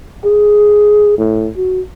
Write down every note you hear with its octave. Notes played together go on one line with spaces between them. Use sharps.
G#4
A2
F#4